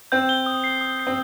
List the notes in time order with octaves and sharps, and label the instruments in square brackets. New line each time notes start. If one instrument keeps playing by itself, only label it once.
[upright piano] C4 [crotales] G6
[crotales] G7
D#6
C7
D#6
C7
[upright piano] C4